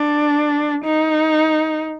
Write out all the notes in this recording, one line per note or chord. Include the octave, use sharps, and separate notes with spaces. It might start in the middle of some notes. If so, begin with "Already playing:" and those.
Already playing: D4
D#4